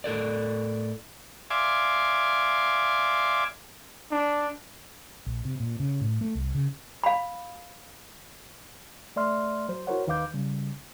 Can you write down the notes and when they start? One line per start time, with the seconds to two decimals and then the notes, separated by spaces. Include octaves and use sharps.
0.04 A2 A4 A#4 D5
1.50 D5 E5 F5 G#5 C6 D6
4.11 D4
5.26 A#1
5.45 C3
5.60 A#2
5.80 C#3
6.01 A2
6.21 A3
6.35 C2
6.55 C#3
7.04 F5 B5
9.16 A3 D5 E5 C6 F6
9.69 F#3 C5
9.87 E4 F#4 A#4 C5 C#5 F#5
10.07 D#2 D#3 B4 F5 D6 G6
10.34 C#3 G3